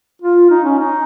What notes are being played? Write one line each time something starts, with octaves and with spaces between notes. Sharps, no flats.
F4
D#4
C#4
D#4